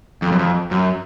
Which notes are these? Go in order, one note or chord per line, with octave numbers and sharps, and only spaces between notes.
F2
F#2
F2
F#2